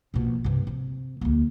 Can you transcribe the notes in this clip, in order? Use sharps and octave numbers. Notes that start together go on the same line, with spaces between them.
A#1 B2
G2 C3
C3
D2 A#3